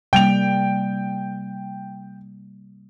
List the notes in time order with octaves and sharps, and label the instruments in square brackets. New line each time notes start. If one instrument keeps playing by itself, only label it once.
[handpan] C3 G3 A#3 [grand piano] G5 F7